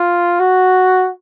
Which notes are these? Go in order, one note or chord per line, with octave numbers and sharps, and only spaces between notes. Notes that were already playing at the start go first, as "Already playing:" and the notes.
Already playing: F4
F#4